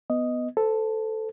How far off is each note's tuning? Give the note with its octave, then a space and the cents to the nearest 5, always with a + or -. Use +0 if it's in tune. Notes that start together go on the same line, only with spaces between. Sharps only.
B3 +5 D#5 +0
A4 +0 C5 -30